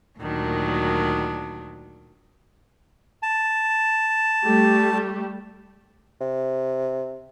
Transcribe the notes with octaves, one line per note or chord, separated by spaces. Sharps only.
D2 A#2 D#3 F#3 D4
A5
G3 A3 G4
C3